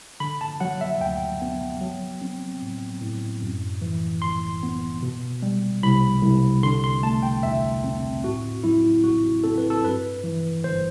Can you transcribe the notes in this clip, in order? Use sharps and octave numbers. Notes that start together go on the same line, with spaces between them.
D3 B5
A5
F#3 F#5
E5
D2 G5
B3
F#3
C4
A2
A2
F#2
E3
G1 C6
B3
B2
G3
C2 B5
C2
D3 C6
C6
A3 A5
G5
E2 E5
C4
A2 F#4
F#3 E4
A1 F#4
C4 A4
B4
A4
G2 B4
E3
G1 C5